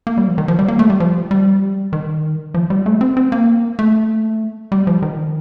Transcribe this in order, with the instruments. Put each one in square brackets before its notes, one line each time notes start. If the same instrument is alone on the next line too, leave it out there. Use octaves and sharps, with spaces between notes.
[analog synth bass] A#3
G3
F3
D#3
F3
G3
A#3
A3
G3
F3
G3
D#3
F3
G3
A3
C4
C4
A#3
A3
G3
F3
D#3